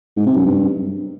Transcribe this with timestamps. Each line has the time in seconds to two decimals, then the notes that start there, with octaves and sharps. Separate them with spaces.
0.17 G#2
0.26 C3
0.36 F#2
0.45 G2